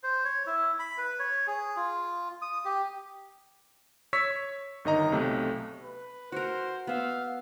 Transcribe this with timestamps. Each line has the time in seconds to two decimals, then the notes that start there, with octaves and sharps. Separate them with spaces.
0.03 C5
0.24 C#5
0.47 E4
0.79 B5
0.98 B4
1.19 C#5
1.47 G#4
1.76 F4
2.42 D#6
2.65 G4
4.13 C#5 C#6 E6 B6
4.85 G1 D#3 D#5 A#5
5.12 B1 C3 A3
5.83 B4
6.32 F#4 A#4 C5
6.87 B3 E5 F5